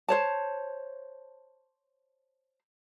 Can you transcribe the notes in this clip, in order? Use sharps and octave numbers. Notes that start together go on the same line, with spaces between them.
C5 C#5 A5